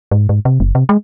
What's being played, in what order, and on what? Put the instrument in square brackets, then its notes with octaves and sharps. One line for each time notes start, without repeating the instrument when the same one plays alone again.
[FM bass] G#2
G#2
C3
F#1
C3
G#3